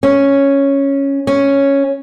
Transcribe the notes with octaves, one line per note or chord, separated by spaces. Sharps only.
C#4
C#4